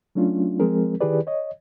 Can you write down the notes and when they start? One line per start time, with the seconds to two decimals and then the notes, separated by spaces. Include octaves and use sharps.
0.15 F#3 A3 C#4 D4 F4
0.60 F3 G#3 C4 G#4 A#4
1.01 D#3 E4 G4 G#4 B4 D5
1.27 C#5 D#5